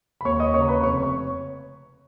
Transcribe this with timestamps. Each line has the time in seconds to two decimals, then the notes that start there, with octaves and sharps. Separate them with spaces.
0.21 B5
0.25 D#2 C#5 C#6
0.40 D#5 D#6
0.54 C#3 C#5 C#6
0.61 A#5
0.68 B4 B5
0.83 F1 C#5 C#6
1.03 C#5 C#6